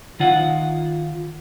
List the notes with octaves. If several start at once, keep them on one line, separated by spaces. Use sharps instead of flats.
D#3 F4 F#5